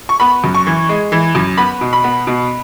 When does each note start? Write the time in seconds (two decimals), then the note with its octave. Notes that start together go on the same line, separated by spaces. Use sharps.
0.09 C#6
0.20 B3 B5
0.44 F#2
0.55 C#6
0.67 E3
0.89 G#3
1.12 E3
1.35 F#2
1.58 B3 B5
1.81 B2
1.93 B5
2.04 B3
2.27 B2